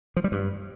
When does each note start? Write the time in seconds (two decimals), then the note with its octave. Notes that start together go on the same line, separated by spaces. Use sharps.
0.17 F3
0.24 G3
0.32 G2